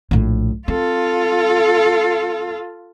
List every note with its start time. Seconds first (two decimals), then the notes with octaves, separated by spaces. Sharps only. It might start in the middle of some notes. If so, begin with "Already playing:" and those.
0.11 A#1 A2
0.68 C4 F4 A4